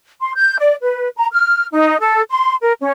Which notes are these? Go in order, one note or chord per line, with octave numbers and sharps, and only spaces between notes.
C6
G6
D5
B4
A#5
F6
D#4
A4
C6
A#4
C#4